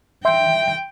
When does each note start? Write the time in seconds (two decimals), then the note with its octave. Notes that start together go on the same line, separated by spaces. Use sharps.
0.25 E5 G5 C6 G6